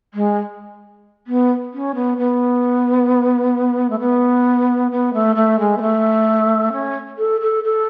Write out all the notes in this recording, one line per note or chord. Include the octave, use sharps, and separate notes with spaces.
G#3
B3
C#4
B3
B3
A3
B3
B3
A3
A3
G#3
B3
A3
C#4
A4
A4
A4